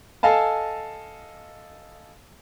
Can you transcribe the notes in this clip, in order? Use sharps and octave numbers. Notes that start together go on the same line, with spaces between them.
A4 D#5 F5 G#5 A5